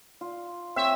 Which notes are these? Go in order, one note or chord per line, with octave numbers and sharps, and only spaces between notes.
F4
C4 C#5 E5